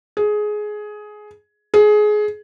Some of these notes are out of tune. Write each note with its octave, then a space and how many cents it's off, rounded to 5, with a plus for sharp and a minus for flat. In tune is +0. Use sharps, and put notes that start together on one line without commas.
G#4 +15
G#4 +20